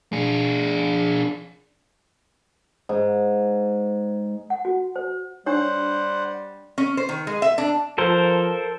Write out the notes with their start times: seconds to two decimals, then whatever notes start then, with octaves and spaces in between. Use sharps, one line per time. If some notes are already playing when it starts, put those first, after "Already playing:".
0.13 D4 G#4
2.89 G#2
4.50 F#5
4.65 F#4
4.96 C5
5.46 G3 D4 G4 C5 C#5 F#5
6.78 C#4
6.97 C5
7.09 D#3
7.27 G#3
7.42 E5
7.58 D4
7.98 F3 A4 A#4 C5